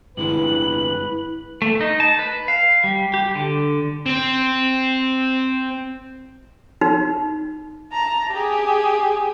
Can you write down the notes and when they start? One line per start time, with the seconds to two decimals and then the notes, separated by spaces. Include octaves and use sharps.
0.17 G2 D3 G#3 E4 B4 F#7
1.62 A3
1.81 D#4
2.00 A5
2.19 B4
2.48 F5
2.84 G3
3.14 G4
3.35 D3
4.06 C4 C5
6.81 D#4
7.92 A5 A#5
8.32 G4 G#4